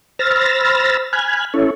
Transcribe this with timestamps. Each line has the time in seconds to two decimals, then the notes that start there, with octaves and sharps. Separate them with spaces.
0.19 C5 B5 E6 F6 A6 A#6
1.13 G#5 B5 F6 F#6 G#6
1.54 C#4 E4 A4 C#5